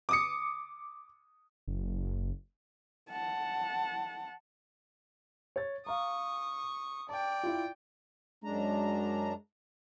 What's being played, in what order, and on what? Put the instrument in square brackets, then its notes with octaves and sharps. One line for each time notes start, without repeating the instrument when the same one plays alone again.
[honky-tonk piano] D6 D#6 C#7
[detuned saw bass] F#1
[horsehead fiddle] F#5 A5
[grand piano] C#5 A6
[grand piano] F5 A#5 [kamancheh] C#6 D#6
[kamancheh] D5 G5 [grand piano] A5
[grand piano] E4 F4
[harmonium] F#2 D4 A#5 [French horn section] G#3